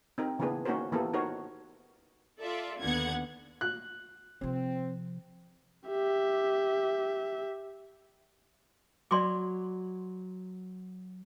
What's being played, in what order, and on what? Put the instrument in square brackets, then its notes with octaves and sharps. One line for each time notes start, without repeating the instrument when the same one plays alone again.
[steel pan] C4 D#4 A#4
C#3 E3 A#3 B3 D4 G#4
A#3 C#4 D#4 F#4 A#4 C5
E3 A#3 B3 G4 A4
D#4 F#4 A#4 C5 C#5
[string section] F4 A4 D5 E5
D#2 D3 B3 F#5 G#6
[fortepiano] F#6
[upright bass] C3 F3 [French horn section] C4
[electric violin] G4 E5
[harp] F#3 [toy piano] D5 C6 D6